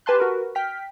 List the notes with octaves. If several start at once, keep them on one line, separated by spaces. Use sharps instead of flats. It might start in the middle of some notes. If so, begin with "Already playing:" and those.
G4 B4 G#5 A5 C6 F#6
F#4 A#4 B4
G5 F6 B6